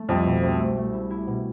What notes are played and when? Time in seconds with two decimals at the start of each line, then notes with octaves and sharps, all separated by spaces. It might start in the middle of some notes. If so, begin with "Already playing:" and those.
Already playing: A3
0.09 C2 F2
0.26 B2
0.43 C2
0.60 A3
0.77 A3
0.94 E4
1.10 E4
1.27 B2